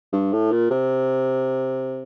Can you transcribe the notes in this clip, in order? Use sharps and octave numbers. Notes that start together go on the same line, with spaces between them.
G2
A2
A#2
C3